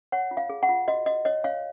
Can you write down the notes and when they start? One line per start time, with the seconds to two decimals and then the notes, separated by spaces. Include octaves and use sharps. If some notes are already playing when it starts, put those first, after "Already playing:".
0.12 C#5 F#5
0.31 F4
0.37 F5
0.49 G#4
0.63 F#5
0.69 F4
0.88 F#4 D#5
1.06 F#4 D#5
1.25 C#5 D#5
1.44 C#5 F5